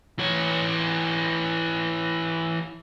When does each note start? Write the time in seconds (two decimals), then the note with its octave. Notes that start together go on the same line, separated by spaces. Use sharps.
0.19 E3 C#5